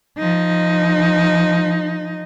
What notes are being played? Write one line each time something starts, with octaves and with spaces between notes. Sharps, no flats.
F3 D#4